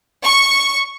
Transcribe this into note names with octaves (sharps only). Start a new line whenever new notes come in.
C#6